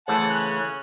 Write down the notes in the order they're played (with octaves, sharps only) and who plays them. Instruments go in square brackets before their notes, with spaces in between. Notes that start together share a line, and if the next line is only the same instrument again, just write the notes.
[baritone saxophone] C#3 [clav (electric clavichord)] E3 A3 C5 [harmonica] F#5 A5
[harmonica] C#4 [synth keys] F#6